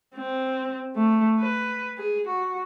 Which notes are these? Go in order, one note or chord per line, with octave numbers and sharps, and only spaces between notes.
C4
A3
B4
G#4
F#4